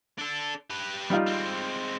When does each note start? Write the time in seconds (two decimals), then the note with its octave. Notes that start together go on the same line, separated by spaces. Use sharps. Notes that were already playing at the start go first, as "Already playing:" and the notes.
0.18 D4 A4
0.70 G4 B4
1.10 G3 D#4 F4
1.27 G#3 C4